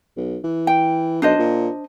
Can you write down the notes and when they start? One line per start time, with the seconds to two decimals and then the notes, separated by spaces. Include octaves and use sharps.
0.16 B1
0.43 E3
0.67 G5
1.22 B1 D4 C5 D#5
1.39 A#2